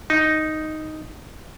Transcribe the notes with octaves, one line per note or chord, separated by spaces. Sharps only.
D#4